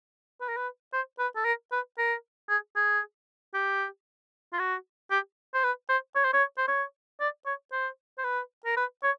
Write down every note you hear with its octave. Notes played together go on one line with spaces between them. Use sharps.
B4
A#4
B4
C5
B4
A4
A#4
B4
A#4
G#4
G#4
G4
F4
F#4
G4
C5
B4
C5
C#5
C5
C#5
C5
C#5
D5
C#5
C5
C5
B4
A#4
B4
C#5